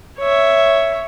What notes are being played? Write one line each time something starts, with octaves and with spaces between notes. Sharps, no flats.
C#5 E5